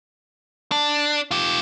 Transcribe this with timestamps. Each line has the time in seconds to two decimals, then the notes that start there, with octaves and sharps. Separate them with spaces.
0.72 D4
1.31 F4 G4